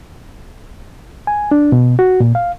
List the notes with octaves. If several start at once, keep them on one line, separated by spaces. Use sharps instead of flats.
G#5
D4
B2
F#4
A#2
F5